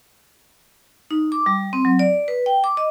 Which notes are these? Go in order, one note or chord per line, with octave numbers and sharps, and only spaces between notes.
D#4
D6
G3
C4
F#3
D5
B4
G5
D6
D#5